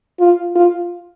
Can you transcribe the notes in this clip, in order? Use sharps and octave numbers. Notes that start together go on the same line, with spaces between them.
F4
F4